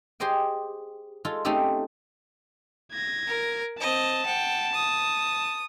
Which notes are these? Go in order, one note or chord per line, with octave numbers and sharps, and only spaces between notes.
G4 G#4 C5 D#5 G5
G#3 F4 A4
A3 C4 C#4 D#4 G4 A4
G#6 A#6
A#4
C4 D#5 A5
F#5 G5
D#6